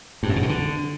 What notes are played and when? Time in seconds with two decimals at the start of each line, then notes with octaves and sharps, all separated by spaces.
0.23 G2
0.29 F#2
0.36 B2
0.43 A#2
0.49 D3